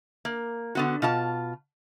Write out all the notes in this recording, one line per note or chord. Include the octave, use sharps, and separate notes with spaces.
A#3
D3 B3 F#4
B2 F4 A5